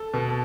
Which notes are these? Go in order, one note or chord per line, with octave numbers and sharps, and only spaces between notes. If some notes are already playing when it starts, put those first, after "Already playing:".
Already playing: A4
B2